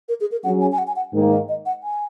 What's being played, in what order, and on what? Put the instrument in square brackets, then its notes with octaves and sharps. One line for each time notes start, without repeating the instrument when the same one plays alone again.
[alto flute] A#4
G#4
A#4
[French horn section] F#3 C#4 G#4 [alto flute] F#5
[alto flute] G#5
G#5
F#5
G#5
F#5
[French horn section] G#2 D#3 A#3
[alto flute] D#5
D#5
F#5
G#5